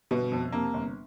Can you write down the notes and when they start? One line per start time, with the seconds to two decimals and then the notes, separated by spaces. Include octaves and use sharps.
0.11 G1 B2 B3
0.32 F2
0.52 C3 A#3
0.74 G1